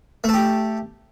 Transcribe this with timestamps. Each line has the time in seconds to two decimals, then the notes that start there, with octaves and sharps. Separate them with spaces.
0.24 A3
0.29 A4
0.34 G4